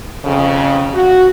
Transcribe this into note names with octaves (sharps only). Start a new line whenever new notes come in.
F2 C#3
F#4